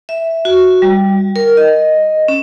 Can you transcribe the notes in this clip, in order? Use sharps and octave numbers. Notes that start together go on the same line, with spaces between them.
E5
F#4
G3
A#4
D#5
C#4